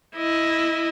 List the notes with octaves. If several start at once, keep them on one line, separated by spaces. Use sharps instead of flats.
E4 D#5